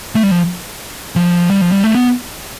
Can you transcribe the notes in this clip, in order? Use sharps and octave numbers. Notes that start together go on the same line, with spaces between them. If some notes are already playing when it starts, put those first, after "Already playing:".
A3
G3
F3
F3
G3
F3
G3
A3
B3